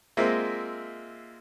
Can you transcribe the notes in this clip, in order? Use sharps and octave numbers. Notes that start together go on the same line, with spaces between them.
G#3 A#3 C4 F4 E5